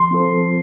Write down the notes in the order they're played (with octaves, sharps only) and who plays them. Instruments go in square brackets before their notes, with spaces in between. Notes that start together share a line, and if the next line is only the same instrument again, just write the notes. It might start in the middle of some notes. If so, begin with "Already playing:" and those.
Already playing: [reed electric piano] F3 [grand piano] C6
[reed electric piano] C4 F4 A4 C5
F3